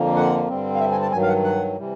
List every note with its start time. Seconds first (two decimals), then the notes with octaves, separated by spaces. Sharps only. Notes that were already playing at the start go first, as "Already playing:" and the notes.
Already playing: F2 D3 F3 A#3
0.16 F#5
0.49 G2 D3 G3 C4
0.74 F5
0.80 E5
0.91 G#5
1.02 A5
1.12 G2 D#3 F#3 G#5
1.22 F5
1.28 F#5
1.44 F#5
1.76 C3 E3 G3